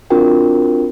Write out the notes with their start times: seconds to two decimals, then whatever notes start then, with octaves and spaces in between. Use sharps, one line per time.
0.10 C4 D4 F4 F#4 A#4 G5